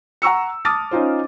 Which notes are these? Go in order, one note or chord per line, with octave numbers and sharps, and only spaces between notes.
F#5 A#5 C#6 E6 C#7
A5 D6 D#6 F6 A6
C#4 D#4 F4 C5